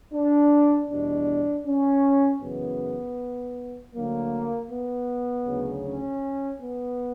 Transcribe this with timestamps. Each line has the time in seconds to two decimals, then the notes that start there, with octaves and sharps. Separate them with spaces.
0.13 D4
0.91 E2 B2 G3 D4
1.67 C#4
2.42 F#2 C#3 E3 B3
3.95 D2 D3 F#3 A#3
4.71 B3
5.47 D2 C#3 F#3
5.86 C#4
6.61 B3